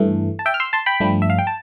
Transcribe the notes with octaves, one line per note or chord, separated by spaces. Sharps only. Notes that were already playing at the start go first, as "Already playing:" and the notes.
Already playing: G2 E3 A3
A5
E5 G5
F6
C6 E6
A5 C6
G5 B5
G2 F3 A3 D4
E5
F5
G5
A5